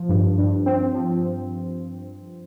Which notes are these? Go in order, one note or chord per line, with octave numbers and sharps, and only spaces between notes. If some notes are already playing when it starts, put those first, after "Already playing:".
Already playing: F3
G2
G2
C4
F3